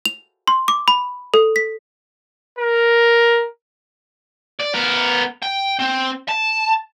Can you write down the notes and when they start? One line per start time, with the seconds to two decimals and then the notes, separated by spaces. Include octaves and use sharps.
0.05 F7
0.48 C6
0.68 D6
0.88 B5
1.34 A4
1.56 B6
2.59 A#4
4.60 D5
4.74 B3 A#4
5.43 G5
5.79 C4
6.28 A5